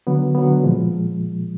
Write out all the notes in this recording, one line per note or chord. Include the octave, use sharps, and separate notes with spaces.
D3 F#3 B3
D3 F#3 B3
A#2 F3 G#3